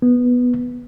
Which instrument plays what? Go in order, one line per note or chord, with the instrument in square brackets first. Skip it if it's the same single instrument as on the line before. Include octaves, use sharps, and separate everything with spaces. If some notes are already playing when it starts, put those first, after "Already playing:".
[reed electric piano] B3